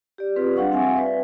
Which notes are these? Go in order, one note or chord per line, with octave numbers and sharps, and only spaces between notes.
G4 D5
C4 F4 G4 G#4 B4
G3 D4 F5 F#5 C#6
C4 E5 F#5 G#5
B4 D5 E5